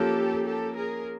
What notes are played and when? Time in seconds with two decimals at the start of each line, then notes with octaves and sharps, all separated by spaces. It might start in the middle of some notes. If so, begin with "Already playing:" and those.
Already playing: F3 A#3 C#4 G4 A4
0.47 G4 A4
0.76 G#4 A#4